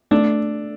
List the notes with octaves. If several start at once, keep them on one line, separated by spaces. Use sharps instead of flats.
A3 D4